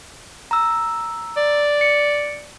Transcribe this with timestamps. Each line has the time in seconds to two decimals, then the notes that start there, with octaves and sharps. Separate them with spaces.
0.51 A#5 E6
1.37 D5
1.81 C#7